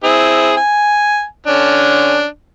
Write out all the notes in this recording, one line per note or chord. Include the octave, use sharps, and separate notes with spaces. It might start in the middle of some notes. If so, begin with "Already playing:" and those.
C4 E4 G#4
G#5
D3 C#4 D4